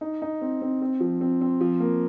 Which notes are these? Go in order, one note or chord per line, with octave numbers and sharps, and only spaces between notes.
D#4
D#4
C4
C4
C4
F3
C4
C4
F3
A#3